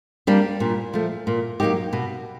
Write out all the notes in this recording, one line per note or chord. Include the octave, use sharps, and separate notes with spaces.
G3 A#3 D4
A#2
F3 A3
A#2
F#3 A#3 D#4 G4
B2